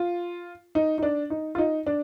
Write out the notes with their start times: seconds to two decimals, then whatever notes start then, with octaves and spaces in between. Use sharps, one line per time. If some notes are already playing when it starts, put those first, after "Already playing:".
Already playing: F4
0.75 D#4
0.98 D#4
1.03 D4
1.30 D#4
1.55 F4
1.58 D#4
1.87 D4